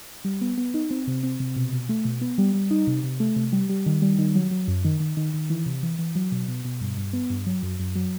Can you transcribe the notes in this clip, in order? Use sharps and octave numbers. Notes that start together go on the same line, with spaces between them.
G3
B3
B3
D#4
C4
C3
C4
C3
B2
B2
A3
B2
B3
G3
G3
D#4
C3
C3
A3
C3
G3
G3
D#3
G3
D#3
F#3
F#3
F#2
D#3
D#3
D#3
D#3
E3
C3
E3
E3
F#3
B2
B2
B2
G2
G2
B3
G2
F#3
F#2
F#2
F#3